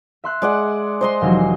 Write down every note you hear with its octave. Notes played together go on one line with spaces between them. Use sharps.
E5 C6 F#6
G#3 D5 F#5
C5 D#5 C6
F1 E3 F#3